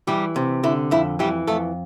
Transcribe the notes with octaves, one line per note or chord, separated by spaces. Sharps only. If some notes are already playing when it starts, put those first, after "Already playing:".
E3 G3 G4
C3
D3 E4
F2 E4
E3 G3 G4
F2 A3 A4